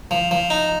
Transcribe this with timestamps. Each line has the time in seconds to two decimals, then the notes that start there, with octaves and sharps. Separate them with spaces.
0.11 F3
0.31 F3
0.50 D#4